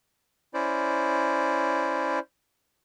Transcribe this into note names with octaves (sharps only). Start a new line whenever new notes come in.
C#4 E4 C5 D5